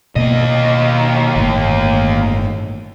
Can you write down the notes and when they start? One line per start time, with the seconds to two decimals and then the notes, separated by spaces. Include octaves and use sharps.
0.16 D#2 B2 A#3 B3 D#5
1.36 G1 A2